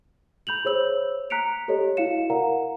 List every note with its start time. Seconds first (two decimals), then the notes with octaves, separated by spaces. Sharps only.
0.47 B5 G6 F7 F#7
0.65 G#4 C5 C#5 E6 F#7
1.30 A#5 F#6 B6 C#7 D7 F7
1.68 G4 A4 C#5 D#5
1.97 E4 F#4 F5 C#7 E7
2.30 A#4 D5 F5 F#5 A#5